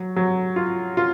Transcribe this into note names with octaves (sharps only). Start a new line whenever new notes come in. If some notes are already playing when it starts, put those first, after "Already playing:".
Already playing: F#3
F#3
F4
F4